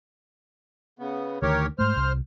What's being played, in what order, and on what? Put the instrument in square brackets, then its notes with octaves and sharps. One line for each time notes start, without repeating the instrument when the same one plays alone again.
[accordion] C#3 B3
[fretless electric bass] D2 D#3 [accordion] G4 A#4 C#5
[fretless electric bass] G#2 A3 [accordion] C5 F6
[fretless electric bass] C2